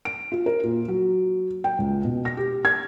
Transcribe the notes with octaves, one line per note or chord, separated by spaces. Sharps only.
D7
F4
A#4
A#2
F#3
G5
C#2
B2
A#6
G4
G#6